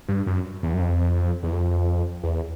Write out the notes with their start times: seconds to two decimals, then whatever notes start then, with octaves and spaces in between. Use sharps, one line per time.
0.08 G2
0.27 F#2
0.63 E2
0.74 F#2
0.81 F2
1.43 E2
1.52 F2
2.24 E2